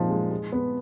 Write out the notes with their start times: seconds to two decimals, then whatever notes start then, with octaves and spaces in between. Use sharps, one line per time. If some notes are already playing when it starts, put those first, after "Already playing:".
Already playing: A#2 F3 G#3 D#4
0.10 G#3
0.31 G#3
0.52 B3